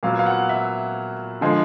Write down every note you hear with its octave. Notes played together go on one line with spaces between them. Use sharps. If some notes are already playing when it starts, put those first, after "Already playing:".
A#2 F#3 B3 F5
F5
F#5
E5
D3 F3 G#3